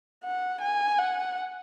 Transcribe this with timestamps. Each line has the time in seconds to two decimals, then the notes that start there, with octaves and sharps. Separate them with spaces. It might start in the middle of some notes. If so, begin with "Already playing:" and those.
0.24 F#5
0.61 G#5
0.98 F#5